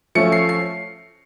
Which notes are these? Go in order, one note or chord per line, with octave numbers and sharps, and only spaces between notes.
F3 A3 C#4 C#7
C7
C7